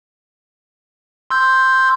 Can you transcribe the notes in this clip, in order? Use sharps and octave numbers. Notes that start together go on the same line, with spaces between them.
C6 E6 G6